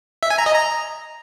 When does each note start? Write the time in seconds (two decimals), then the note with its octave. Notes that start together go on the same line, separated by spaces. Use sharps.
0.23 E5
0.30 G#5
0.38 A#5
0.46 D#5
0.54 A#5